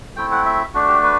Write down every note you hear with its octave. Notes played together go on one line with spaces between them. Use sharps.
A3 C4 E4 G5
F#5
E5
A3 D4 F#4
G4
B4